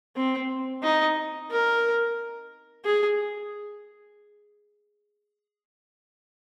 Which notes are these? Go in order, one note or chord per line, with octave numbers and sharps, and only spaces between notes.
C4
D#4
A#4
G#4